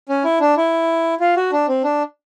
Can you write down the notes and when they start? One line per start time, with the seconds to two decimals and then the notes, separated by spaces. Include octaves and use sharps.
0.09 C#4
0.24 E4
0.40 D4
0.57 E4
1.20 F4
1.37 F#4
1.52 D4
1.68 C4
1.84 D4